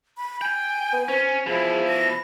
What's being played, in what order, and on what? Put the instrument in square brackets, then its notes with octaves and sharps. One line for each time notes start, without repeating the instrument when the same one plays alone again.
[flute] B5
[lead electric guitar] G5 [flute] G#5
[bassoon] B3
[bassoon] C4 [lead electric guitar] C#4
[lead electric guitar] B2 E4 [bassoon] F3 [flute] G#4
[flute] A#6